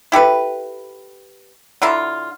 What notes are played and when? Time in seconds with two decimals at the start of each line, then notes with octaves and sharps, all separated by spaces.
0.12 E4 G4 A4 B4
1.82 D3 F#3 E4 F4